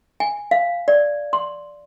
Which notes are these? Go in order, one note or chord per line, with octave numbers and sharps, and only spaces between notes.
G#5
F5
D5
C6